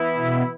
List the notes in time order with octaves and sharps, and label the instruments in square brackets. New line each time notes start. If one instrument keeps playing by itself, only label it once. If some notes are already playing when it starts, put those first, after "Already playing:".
Already playing: [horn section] E3 B3 E4
[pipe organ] B2